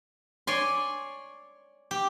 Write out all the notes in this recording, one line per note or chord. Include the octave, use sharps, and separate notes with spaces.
C#5 D5 G#5 C6
G4